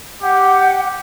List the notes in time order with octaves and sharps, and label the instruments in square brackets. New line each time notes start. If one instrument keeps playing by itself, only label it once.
[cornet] G4 [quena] F#5